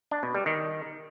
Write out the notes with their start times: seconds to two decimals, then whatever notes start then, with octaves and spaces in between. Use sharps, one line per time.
0.11 D4
0.23 B2
0.35 G3
0.46 D#3